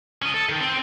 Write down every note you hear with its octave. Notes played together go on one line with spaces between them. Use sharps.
C#4 D#5
A4
D#3
C4